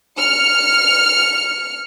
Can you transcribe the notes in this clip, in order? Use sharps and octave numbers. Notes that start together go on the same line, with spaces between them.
F6 C#7